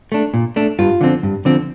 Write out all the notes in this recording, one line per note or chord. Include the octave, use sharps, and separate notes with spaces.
A3 D4
A#2
A3 D4
G2 F4
D3 F3 C4
G2
D3 F3 C4